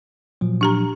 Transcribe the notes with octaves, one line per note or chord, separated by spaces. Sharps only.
A#2 F3 F#3
D4 G4 A#5